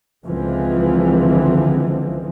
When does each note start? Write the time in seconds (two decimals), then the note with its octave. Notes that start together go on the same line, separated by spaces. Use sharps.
0.24 C#2 D3 E3 F3 G#3 C4